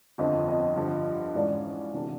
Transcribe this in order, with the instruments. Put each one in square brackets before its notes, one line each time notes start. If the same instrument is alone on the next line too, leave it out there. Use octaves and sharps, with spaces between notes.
[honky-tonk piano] G1 F2 D3 F3 [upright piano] D#5
[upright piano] D#5
[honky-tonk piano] G2 D3 F3
[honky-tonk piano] G#2 E3 G#3 C#4 F4 [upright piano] D5
[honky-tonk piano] C3 E3 A3 D4 F#4